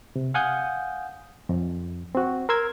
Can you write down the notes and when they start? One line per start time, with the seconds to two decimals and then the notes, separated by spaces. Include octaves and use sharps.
0.16 C3
0.34 F5 F#5 G#5 D#6 G6
1.49 F2
2.15 C4 F#4
2.49 A#4 C6 E6 G#6